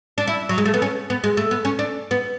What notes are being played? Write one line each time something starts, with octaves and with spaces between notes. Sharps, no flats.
D4
E4
F#3
G#3
A3
B3
C#4
B3
G#3
A3
B3
C#4
D4
B3